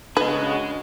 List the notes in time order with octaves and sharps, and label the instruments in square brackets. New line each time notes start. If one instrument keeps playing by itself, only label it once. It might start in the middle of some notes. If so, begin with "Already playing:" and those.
[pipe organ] C#3 B3 F#4 [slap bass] D4 [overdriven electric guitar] G#4 D#5 [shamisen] B4